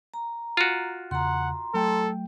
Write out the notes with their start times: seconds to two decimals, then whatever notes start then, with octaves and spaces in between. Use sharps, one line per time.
0.14 A#5
0.57 F4 F#4
1.11 E2 C#3 F#5 A#5 C6
1.74 F#3 A3 A4 G5